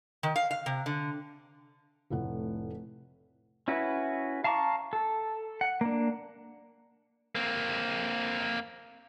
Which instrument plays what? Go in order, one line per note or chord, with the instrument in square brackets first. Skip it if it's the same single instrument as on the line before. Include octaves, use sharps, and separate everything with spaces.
[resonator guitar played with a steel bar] D#3
F5
F5
C3
D3
[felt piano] F1 A2 F#5
[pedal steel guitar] C#4 E4 F#4 B4
F5 A5 A#5 C#6 D6
A4
F#5
A#3 D4
[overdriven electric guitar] A#3 C4